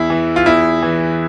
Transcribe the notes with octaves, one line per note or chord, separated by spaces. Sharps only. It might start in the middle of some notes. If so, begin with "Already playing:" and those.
Already playing: E2 E4
E3
F4
E2 E4
E3